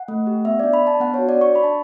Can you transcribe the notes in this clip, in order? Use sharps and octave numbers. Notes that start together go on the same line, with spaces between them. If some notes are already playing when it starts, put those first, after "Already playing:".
Already playing: F#5
A3
G4
B3 E5
D4 D5
B5
D4 A5
B3 F#5
F#4 C#5
D5
D4 C#6
D4 B5
A5